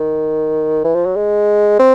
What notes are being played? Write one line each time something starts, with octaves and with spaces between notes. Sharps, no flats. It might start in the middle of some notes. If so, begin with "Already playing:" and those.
Already playing: D#3
E3
F3
F#3
G#3
C4